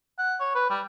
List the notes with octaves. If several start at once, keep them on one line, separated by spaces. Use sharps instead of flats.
F#5
C#5
B4
G3